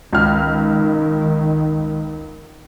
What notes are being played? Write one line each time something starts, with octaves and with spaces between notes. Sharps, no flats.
C#2 D#3 F6